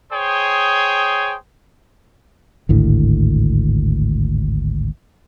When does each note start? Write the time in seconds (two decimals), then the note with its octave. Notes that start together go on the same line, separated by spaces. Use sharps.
0.13 G#4 C5 C#5 G5 D#6
2.69 G#1 D2 A2